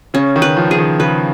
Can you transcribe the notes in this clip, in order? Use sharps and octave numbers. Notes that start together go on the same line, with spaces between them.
C#3 C#4
D#3
B4
F3
G#4
D#3
C#3 B4